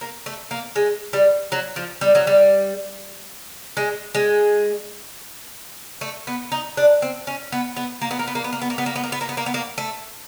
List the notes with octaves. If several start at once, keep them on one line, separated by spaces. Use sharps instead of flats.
A#3
A3
A#3
G#3
G3
F#3
F3
G3
F#3
G3
G#3
G#3
A3
B3
D#4
D4
C4
C#4
B3
B3
A#3
B3
A#3
B3
A#3
B3
A#3
B3
A#3
B3
A#3
B3
A#3
B3
A#3
B3
A#3
B3
A#3
A3